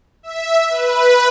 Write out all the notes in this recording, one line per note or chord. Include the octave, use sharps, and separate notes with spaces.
E5
B4